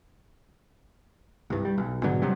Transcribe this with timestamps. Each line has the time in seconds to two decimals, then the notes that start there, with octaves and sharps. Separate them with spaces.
1.50 C2 G2
1.65 G3
1.78 B1
2.03 G#2 B2 D3 F#3
2.22 F1 C3 F#3 G3